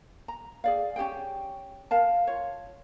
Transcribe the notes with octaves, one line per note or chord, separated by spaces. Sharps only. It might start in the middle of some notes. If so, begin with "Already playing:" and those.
A#5
G#4 D5 F5
C#4 G4 G#4 G5
A#4 F5 A5
F4 C#5